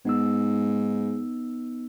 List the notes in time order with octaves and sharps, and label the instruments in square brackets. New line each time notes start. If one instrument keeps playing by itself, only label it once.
[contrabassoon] G#2 [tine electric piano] B3 D#4 E6